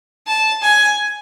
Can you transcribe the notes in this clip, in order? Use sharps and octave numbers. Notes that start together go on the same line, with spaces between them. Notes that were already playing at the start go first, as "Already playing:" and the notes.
A5
G#5